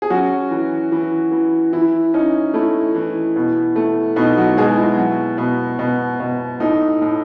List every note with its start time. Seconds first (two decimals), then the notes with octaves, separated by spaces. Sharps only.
0.02 G#4
0.10 F#3 C#4 F#4
0.51 E3
0.92 E3
1.32 E3
1.73 E3 E4
2.14 C#4 D#4
2.54 A3 E4
2.95 E3
3.36 B2
3.76 A3
4.16 B2 D#4
4.37 F#3 F#4
4.57 B2 G#3 G#4
4.77 E4
4.98 F#3
5.38 B2
5.79 B2
6.20 B2
6.60 A2 D#4
7.02 A2